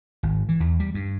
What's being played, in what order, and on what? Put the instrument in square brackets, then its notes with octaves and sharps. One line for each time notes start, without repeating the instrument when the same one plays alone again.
[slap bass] G#1
E3
E2
G3
G2